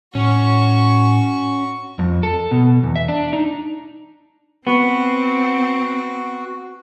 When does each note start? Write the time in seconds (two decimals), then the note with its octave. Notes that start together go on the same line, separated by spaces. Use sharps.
0.15 A2 C#4 F#4 C#6
1.99 F2
2.23 A4
2.51 B2
2.83 E2
2.96 E5
3.08 D4
3.33 D#4
4.67 B3 C4 F#4